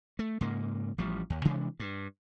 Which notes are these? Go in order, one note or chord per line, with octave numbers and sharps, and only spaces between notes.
A3
G#2 C#3 A#3
A1 F3 G3
D#2
C3 E3 G#3 D4
G2